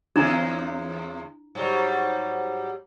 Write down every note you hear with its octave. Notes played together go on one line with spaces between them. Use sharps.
E2 G#3 D4 E4 A#5
G#2 F#3 G3